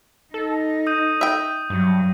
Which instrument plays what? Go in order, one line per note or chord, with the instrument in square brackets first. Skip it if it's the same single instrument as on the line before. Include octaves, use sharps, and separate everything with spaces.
[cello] D#4 [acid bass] A4
[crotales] D#6 G6 D#7
[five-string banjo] E5 G5
[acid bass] G2 [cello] F#3